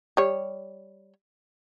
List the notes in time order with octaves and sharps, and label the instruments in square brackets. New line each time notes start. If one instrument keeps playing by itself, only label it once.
[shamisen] G3 C#5